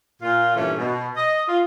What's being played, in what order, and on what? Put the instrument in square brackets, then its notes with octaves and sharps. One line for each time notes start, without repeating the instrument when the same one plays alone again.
[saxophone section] A#2 F4
G2 A#2 E3 A3 C#4
B2
D#5
F4